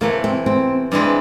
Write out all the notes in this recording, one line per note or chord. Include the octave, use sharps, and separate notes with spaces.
C3 E3 A3 A#3
C4
C4
G2 E3 G#3 C4